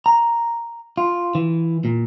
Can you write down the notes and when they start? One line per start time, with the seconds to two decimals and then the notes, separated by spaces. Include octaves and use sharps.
0.06 A#5
0.98 F4
1.35 E3
1.85 A#2